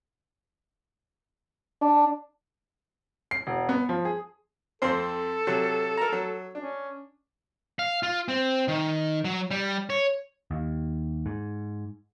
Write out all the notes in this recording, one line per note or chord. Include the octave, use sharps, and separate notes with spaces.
D4
C7
E1
B3
F3
G#4
F2 C4 A4 C5
C3 F#3
A#4 A#5
F#3
C#4 D4
F5
F4
C4
D#3
F#3
G3
C#5
D#2
G#2